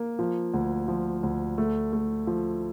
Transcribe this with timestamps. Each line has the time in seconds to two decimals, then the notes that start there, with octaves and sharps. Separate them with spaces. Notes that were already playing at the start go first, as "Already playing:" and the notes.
Already playing: A#3
0.19 F3
0.54 D2
0.88 F3
1.23 D2
1.58 A3
1.93 A3
2.27 F3